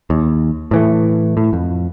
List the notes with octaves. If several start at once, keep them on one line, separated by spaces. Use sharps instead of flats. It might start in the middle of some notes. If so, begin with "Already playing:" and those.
D#2
A2 E3 A3
A2
F2